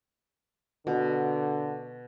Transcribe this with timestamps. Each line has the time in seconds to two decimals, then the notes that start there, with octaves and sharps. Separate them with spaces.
0.87 B2 D3